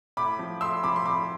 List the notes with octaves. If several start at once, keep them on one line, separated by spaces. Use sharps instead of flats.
A2 B5 D6
F3
A2 C6 E6
F3 B5 D6
C6
A2 B5 D6